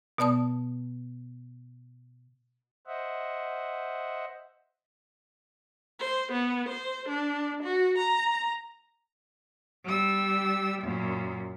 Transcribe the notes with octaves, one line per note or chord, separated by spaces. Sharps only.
B2 B3 D5 A5 D#6
C5 D#5 E5 F#5
C5
B3
C5
D4
F#4
A#5
G3 E6
F#2 A#2